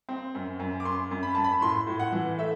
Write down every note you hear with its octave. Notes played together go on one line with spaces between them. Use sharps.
C4
F#2
F#2
D6
F#2 C6
F#2
B5
F#2 A5
B5
A2 C6
A2
F#5
E3
A3 E5